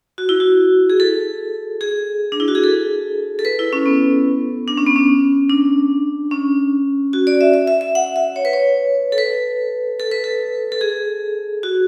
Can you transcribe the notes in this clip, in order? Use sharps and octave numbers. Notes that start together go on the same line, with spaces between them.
F#4
E4
F#4
G#4
A4
G#4
D4
E4
F#4
G#4
A4
A4
B4
E4
C#4
B3
D4
C#4
B3
C#4
D4
C#4
F#4
D5
E5
E5
E5
E5
F#5
E5
C#5
B4
C#5
A4
B4
A4
B4
A4
A4
G#4
F#4